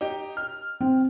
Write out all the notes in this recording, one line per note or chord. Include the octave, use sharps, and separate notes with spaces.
D#4 G4
F6
C4